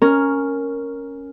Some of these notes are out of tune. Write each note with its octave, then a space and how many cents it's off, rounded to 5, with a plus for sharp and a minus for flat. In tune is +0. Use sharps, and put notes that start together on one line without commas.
C#4 +0 A#4 +0